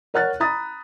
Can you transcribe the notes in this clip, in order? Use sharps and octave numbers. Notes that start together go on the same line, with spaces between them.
A#4 C#5 F#5 F6 F#6 A6
A#5 B5 D#6 A6